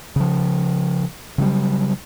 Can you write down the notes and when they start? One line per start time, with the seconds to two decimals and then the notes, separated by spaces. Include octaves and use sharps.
0.16 C#3 F3
1.38 C#3 F#3 G3